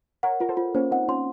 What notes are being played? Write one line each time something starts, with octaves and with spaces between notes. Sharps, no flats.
A#4 C#5 F#5
F4 A#4
A4 C5
F4
A#3 C#4 C5
C4 D#4 F#5
C#4 F4 C6